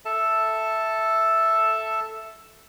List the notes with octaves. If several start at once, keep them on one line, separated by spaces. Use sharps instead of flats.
A4 E5 A5